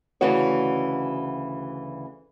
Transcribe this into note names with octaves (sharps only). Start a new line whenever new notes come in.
D2 C#3 E3 C#4 F#4 C#5